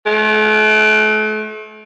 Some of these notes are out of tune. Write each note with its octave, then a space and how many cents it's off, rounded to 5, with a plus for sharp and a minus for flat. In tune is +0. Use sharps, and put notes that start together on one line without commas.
A3 -40